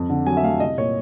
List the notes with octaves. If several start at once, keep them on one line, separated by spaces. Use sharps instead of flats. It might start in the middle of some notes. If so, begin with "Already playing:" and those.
Already playing: F2
D3
F#3 G#5
E5
A3 F5
C2 D#5
A#2 C#5